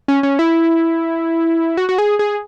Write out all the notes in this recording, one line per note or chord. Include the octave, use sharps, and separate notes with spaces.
C#4
C#4
E4
F#4
F#4
G#4
G#4